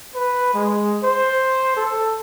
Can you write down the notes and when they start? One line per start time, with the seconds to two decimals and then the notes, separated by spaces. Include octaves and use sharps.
0.15 B4
0.54 G#3
1.04 C5
1.77 A4